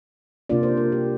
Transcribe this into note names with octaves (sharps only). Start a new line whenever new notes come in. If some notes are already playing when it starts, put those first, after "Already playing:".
C3 A#3 D4 F4 D5
C5
A#4
G4